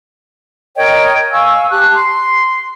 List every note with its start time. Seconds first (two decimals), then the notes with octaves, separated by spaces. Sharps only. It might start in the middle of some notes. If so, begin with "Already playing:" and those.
0.77 A#4 C#5 D#5 G5
1.31 F5 G#5 C#6 E6
1.70 G4 A5 F#6
1.94 C6